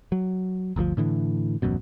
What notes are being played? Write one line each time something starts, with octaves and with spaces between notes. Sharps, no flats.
F#3
G1 D2 D#3 F3
A2 D3 E3
D#1 A1 F#2 B2